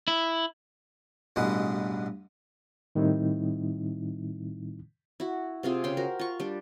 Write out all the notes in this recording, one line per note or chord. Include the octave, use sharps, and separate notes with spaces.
E4
A1 G2 B2 G#3 B3 F#5
A2 D#3 G3 C4 D#4 E4
E4 F#4
C3 C4 F4 G#4
C#3 G5 C6
F#4 A#4 C5
F4 C#6
G3 D4